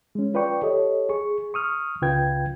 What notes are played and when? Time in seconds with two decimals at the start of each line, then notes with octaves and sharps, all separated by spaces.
0.15 G#3 C#4
0.34 F4 B4 D5 G5 C#6
0.62 G4 A4 C#5 D#5
1.09 G#4 C#6
1.54 C#6 D#6 F6
2.02 C#2 C#3 F4 B4 G5 G#6